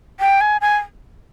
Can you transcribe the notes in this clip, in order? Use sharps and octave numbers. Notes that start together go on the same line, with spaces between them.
G5
G#5
G#5